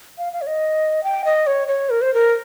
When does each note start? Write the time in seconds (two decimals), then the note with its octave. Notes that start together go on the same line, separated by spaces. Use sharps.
0.18 F5
0.33 F5
0.42 C#5
0.47 D#5
1.04 G5
1.25 D#5
1.47 C#5
1.68 C#5
1.90 A#4
2.02 C5
2.14 A#4